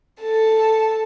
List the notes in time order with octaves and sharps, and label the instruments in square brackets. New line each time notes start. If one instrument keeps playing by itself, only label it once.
[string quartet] A4 A5